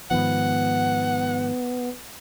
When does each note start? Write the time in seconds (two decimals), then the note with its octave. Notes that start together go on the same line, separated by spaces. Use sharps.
0.11 G#2 D#3 F3 B3 F#5